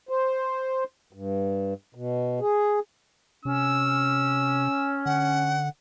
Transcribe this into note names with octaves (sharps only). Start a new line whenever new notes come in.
C5
G2
B2
G#4
C3 C#4 E6
D3 F#5